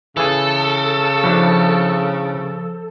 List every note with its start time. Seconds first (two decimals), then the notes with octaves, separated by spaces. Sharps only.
0.17 C#3 E3 G#4 A4
1.24 F3 D4 E4 F#4